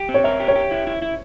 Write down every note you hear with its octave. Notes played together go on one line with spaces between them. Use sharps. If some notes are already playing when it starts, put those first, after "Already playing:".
Already playing: G4
C4
C#5
A#4 E5
G4
C#5
G4
E4
E4
E4